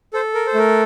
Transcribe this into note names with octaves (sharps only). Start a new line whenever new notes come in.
A4 C5
A#4
C5
A3 A#4